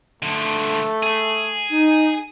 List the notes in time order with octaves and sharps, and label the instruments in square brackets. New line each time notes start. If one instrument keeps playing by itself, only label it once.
[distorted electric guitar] D3 F3 [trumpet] A3
[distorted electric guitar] G#4
[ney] D#4